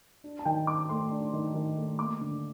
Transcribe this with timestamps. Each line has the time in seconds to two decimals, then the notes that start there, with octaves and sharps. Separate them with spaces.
0.24 D4
0.39 A5
0.45 D#3 G5
0.67 D#3 D6
0.89 A3 C6
1.11 D4
1.33 D#3
1.54 D#3
1.77 A3
1.98 A#3 D6
2.21 D3